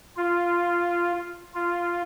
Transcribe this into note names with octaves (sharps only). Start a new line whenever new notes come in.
F4
F4